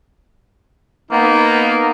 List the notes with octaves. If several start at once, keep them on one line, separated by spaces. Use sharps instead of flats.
A#3 B3 D#4